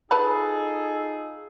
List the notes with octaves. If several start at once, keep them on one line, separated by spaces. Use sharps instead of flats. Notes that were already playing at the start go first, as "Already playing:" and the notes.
D#4 F4 G#4 A4 B4 A5 B5